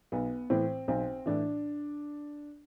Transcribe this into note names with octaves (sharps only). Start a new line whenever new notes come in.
B1 B3
A2 E3 C4
B1 C4
A2 E3 D4